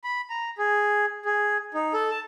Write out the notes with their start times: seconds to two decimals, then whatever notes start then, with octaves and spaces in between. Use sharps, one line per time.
0.04 B5
0.30 A#5
0.58 G#4
1.25 G#4
1.74 D#4
1.93 A4
2.10 A5